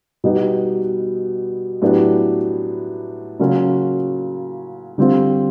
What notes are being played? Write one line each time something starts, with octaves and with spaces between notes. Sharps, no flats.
B2 G3 B3 D#4 G4
A2 F#3 B3 D4 G4
C#3 F#3 A#3 C#4 F4
D3 G3 C4 F4